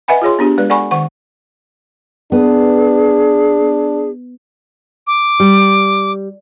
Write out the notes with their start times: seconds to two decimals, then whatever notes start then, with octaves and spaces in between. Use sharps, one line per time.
0.08 B4 D#5 E5 F#5 G#5 B5
0.22 F4 G#4 C#5 C6
0.39 B3 D4 G4
0.58 G#3 B4 D5
0.70 A4 D5 F#5 G#5 B5 C#6
0.91 D#3 F#5 C#6
2.32 B3 D4 G#4
5.07 D6
5.40 G3